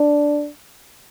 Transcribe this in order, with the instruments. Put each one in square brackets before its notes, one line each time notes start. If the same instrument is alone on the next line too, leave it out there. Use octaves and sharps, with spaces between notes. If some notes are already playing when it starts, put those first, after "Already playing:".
Already playing: [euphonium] D4